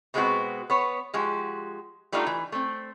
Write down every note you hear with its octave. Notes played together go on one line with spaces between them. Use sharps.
B2 G3 G#3 B3 C4 F#4
B3 C#5
F3 G#3 F#4 G4
G3 A3 D4 D#4 F4 F#4
E3
A3 C4